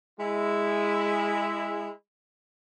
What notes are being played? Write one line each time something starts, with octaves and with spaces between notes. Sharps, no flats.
G#3 E4